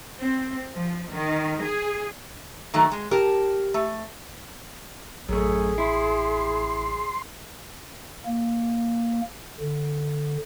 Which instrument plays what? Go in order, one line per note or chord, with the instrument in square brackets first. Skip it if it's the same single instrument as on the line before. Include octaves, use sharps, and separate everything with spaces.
[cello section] C4
F3
D#3
G#4
[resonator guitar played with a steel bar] D#3 F#3 A3
G#3
[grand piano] G4 [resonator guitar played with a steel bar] A#4 A5
[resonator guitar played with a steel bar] A3
[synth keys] A1 [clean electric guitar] F#2 A3 [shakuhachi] G#4
[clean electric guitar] E4 [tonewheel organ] C6
[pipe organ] A#3
D3